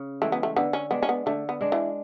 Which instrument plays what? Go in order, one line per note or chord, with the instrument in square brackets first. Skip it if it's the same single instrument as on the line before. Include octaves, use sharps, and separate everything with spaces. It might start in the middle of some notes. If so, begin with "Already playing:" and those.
Already playing: [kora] C#3
[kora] E3 G#3 [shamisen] A3
[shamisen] B3
A3
[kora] D3 [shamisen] B3
[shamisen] C#4
[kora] G#3 D4 [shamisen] B3
[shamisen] C#4
B3
[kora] D3 [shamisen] A3
[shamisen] B3
[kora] G#3 D4
[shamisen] E3